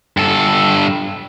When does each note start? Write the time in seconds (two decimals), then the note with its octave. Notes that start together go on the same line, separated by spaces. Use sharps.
0.17 G2 A4